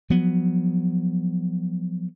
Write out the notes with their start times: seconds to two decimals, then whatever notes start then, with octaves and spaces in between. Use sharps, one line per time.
0.10 F3 F#3 B3